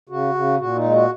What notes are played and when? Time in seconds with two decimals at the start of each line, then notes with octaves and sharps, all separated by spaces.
0.09 C#3 F#4
0.34 C#3
0.59 A#2 F#4
0.76 D#4
0.84 G#3
0.93 F#4